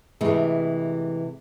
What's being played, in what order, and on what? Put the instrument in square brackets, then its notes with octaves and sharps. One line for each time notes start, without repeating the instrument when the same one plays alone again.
[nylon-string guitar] C3 E3 G#3 A3